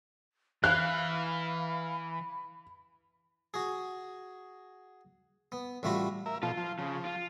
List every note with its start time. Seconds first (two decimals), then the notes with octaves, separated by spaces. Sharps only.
0.64 E3 F5 B5 F#6
3.54 F#4 G#4
5.52 B3
5.83 A1 G3 A3 F4 F#4 B5
6.26 A#4 E5
6.43 B2 F3 F4 A4
6.57 F3
6.79 C#3 F3
7.05 F4